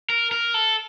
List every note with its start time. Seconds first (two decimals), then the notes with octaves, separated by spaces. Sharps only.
0.10 A#4
0.32 A#4
0.54 A4